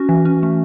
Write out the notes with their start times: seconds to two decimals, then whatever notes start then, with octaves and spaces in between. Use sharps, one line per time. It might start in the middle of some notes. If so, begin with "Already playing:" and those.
Already playing: C#4 F#4
0.09 E3
0.25 C#4
0.43 A3